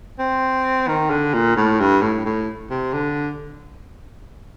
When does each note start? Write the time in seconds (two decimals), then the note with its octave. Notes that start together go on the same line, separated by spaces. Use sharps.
0.19 C4
0.88 D#3
1.10 D3
1.34 A#2
1.56 A2
1.80 G2
2.02 A2
2.26 A2
2.70 C3
2.93 D3